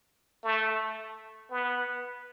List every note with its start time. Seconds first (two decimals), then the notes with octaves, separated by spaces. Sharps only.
0.43 A3
1.51 B3